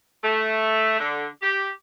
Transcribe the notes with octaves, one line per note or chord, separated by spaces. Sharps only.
A3
D3
G4